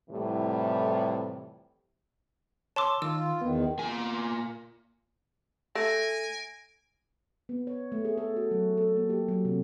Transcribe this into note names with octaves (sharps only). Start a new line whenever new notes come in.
F2 A2 C3 E3 G3
C#5 A5 C6 D6 E6
D#3 F4 E6
E2 D#3 B3
A#2 G#5
A3 G#5 A#6 D7
B3
C#5
A3
G#4
A4
F#4
F#3
A4
A#3
G4
F#3
C3